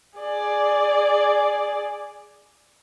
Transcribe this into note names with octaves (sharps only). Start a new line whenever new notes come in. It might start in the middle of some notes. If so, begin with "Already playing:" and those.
G#4 D5